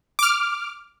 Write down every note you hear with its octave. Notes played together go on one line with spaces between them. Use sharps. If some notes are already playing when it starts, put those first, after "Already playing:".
D6 F6